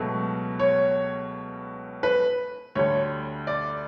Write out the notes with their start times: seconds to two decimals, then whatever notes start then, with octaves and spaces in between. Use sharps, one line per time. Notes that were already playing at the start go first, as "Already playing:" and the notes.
Already playing: C#2 B2 F#3 A3
0.59 C#5
2.03 B4
2.75 D2 D3 G3 C#5
3.47 D5